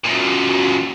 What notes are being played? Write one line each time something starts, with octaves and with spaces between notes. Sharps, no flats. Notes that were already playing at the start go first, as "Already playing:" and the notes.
F#2 A#2